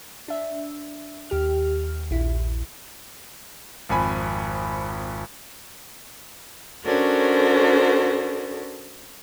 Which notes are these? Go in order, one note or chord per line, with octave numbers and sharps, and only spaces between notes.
D4 E5
D#2 G4 F6
A#1 E4
G#1 F2 G#5 B5
C#4 D4 F#4 A4 A#4 C5